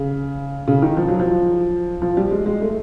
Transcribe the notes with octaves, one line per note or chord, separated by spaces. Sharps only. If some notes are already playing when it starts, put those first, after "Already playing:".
Already playing: C#3
C#3
D#3
F3
F#3
F3
F3
G3
G#3
G#3
A3